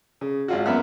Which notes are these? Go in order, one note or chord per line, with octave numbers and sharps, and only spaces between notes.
C#3
G#1 F4 F#4
F#2 A#3 B3 E5 F#5 F6